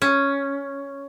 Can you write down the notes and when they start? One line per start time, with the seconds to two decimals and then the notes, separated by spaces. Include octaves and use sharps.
0.02 C#4